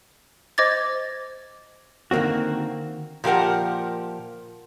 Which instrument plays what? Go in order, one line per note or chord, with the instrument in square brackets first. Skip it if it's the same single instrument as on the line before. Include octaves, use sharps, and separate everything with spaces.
[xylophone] C5 D#5 D6 G#6 A6
[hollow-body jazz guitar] D3 D#3 A#3 C4 F#4
[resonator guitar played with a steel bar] A#2 F3 G4 A#4 F#5